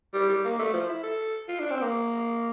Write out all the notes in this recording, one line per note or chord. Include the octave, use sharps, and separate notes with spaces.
G3
G3
A#3
A3
F3
E4
A4
F4
D4
C4
A#3